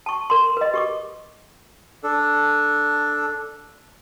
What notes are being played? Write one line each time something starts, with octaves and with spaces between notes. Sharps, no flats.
A5 C#6
A#4 C6
B4 D#5
G4 C#6 D6
D4 A4